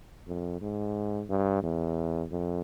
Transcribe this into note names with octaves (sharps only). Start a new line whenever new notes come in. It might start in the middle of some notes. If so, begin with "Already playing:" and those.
F2
G#2
G2
E2
F2